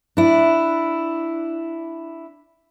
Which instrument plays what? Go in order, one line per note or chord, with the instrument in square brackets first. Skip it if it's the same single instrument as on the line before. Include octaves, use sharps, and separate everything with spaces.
[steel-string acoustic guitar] D4 E4